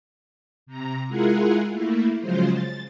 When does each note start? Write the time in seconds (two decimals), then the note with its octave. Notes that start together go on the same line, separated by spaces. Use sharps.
0.66 C3 A#5
1.08 G#3 E4 F4 G#4 A#4 F#5
1.72 A3 A#3 E4
2.20 C#3 F3 F#3 G#3 F4 C5
2.51 A6